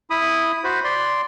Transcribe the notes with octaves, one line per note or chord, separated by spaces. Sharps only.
E4 B5 D#6
F#4 C5 B5
D5 C6